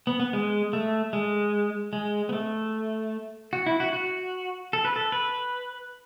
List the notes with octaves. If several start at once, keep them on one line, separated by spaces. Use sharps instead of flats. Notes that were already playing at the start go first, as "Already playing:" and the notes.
B3
B3
G#3
A3
G#3
G#3
B3
A3
F#4
E4
F#4
F#4
A4
B4
A4
B4